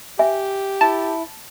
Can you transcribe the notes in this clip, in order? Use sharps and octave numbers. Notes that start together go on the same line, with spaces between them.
G4 E5 G#5
E4 A5